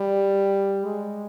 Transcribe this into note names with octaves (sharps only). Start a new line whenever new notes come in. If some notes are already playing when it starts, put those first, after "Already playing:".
Already playing: G3
G#3